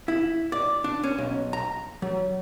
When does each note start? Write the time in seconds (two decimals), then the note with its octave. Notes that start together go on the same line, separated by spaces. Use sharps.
0.08 E4
0.52 D5
0.84 D4
1.03 C#4
1.18 B1
1.53 A#5
2.02 F#3